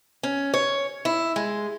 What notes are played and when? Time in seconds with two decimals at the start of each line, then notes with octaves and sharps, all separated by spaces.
0.23 C#4
0.54 C#5
1.05 E4
1.36 G#3